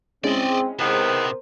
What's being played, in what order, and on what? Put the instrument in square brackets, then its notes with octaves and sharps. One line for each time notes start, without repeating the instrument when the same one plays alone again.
[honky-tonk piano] G#3 C#4 E4 [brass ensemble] C4 [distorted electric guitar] D5 D#5
[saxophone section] E2 D#3 B3 [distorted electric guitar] C3 [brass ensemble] A#4 C5